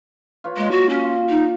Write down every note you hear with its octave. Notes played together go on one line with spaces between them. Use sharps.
F4 B4 C#5
G#3 A#3 D5
F#4
C#4
F4
D#4